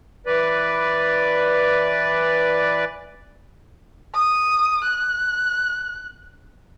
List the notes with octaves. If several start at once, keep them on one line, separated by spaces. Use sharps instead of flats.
E3 B4 D5
D#6
F#6